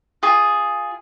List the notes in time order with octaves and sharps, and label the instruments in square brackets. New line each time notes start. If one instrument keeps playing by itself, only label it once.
[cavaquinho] F4 G#4